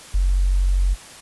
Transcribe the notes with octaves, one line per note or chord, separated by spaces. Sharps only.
F#1